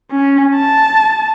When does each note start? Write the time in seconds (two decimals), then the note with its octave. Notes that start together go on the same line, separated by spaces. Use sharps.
0.11 C#4
0.56 A5